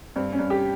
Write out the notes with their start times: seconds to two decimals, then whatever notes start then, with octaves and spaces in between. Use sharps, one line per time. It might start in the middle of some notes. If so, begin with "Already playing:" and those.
0.16 G2 C4
0.33 C#4
0.39 G2
0.50 G4